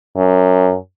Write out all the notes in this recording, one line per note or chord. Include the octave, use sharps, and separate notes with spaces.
F#2